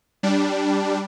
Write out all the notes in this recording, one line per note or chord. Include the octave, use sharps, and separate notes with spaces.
G3 D4